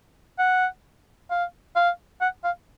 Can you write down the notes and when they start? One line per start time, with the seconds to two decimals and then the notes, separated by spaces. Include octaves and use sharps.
0.39 F#5
1.31 F5
1.76 F5
2.21 F#5
2.44 F5